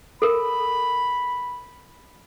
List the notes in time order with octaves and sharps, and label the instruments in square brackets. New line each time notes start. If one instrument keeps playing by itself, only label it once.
[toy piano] A4 A#4 [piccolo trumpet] B5